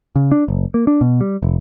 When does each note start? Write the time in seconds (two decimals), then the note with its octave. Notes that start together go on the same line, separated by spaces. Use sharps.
0.16 C#3
0.32 D4
0.48 F#1
0.74 A#3
0.87 D4
1.01 B2
1.21 G3
1.43 F1